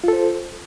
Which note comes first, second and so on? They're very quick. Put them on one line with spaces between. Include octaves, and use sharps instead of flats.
F4 A4 C5